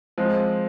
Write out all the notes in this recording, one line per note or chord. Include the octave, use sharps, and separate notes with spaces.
F3 G#3 C4